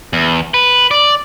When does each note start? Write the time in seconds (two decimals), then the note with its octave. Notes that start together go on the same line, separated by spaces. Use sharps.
0.13 E2
0.54 B4
0.91 D5